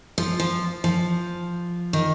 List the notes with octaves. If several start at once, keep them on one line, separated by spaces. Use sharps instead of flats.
F3
F3
F3
D#3